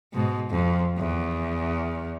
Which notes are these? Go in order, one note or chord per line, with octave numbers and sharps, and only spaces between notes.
G#2 B2
F2
E2